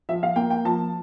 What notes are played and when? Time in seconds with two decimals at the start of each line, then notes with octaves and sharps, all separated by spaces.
0.09 F3 E5
0.23 F5
0.36 A#3 G5
0.50 G5
0.65 F3 A5